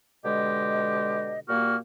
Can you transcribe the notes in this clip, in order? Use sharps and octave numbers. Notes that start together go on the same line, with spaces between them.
B2 D3 G#3 G4 D#5
A#2 G3 A#3 F#4 F6